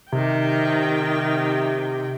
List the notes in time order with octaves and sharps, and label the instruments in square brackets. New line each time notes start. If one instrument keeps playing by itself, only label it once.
[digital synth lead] C3 [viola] D#3 G5